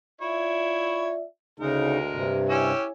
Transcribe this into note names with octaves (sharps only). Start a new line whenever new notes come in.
E4 F4 C#5 D5 E5
D2 C#3 G#3 D#4 A#4
G2 C3
C#4 E4 G4 C#5 G#5 E6